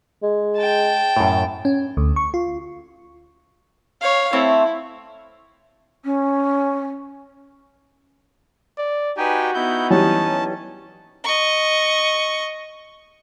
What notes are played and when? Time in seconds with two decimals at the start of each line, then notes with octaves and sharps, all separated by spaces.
0.22 G#3
0.57 G5 A5
1.17 F#2 A2
1.65 C#4
1.97 D2
2.16 C#6
2.34 F4
4.01 C#5 F5
4.33 A3 C4 E4 C#5
6.05 C#4
8.78 D5
9.17 D#4 F#4 G4 B4 G5 G#5
9.54 B3 D#4 E4 G6
9.90 E3 F#3 G3 C#4 A5
11.24 D#5 C#6